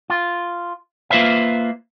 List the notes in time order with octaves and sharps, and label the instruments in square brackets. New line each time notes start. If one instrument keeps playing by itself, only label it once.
[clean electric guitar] F4
A#3 F4 B4 C5 E5 F5